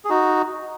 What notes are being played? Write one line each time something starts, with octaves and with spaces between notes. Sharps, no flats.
G#4
D#4 F#4